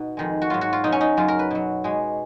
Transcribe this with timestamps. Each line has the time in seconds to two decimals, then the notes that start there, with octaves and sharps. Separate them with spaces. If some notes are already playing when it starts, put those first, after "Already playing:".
Already playing: B2 D#4
0.17 F2 D#3 G#3
0.42 F#4
0.50 G#2 F#3 F4
0.61 F#4
0.73 F4
0.84 B2 F#3 D#4
0.92 C#4
1.01 D#4
1.17 F#2 C#3 F#3 F4
1.28 A#4
1.39 B4
1.51 B2 F#3
1.84 B2 G#3